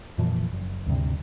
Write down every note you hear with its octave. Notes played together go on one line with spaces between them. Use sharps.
F2 A#2 E3 F3
F#1
D2 G2 C3